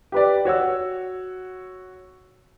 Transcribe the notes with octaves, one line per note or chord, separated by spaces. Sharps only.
G4 B4 D5
F#4 C#5 F#5 E6